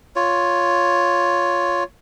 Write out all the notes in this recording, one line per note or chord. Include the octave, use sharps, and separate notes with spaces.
F4 C#5